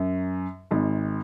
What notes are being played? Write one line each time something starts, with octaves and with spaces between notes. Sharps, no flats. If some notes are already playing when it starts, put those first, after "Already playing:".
Already playing: F#2
G#1 G#2